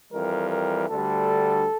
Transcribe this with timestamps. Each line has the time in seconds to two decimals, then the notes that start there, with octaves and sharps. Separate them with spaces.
0.13 F2 E3 G3 A#4
0.51 A#4
0.90 D2 D3 G3 A4